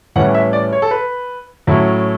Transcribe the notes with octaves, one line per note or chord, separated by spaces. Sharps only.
A2 E3 G3 C#4 F#5
E5
D5
C#5
A4
B4
A2 F#3 A3 C#4 E4